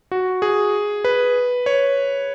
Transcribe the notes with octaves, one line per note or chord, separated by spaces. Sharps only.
F#4
G#4
B4
C#5